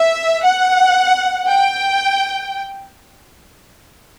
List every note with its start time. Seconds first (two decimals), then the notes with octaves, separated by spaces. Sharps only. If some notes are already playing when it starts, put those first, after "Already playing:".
Already playing: E5
0.44 F#5
1.48 G5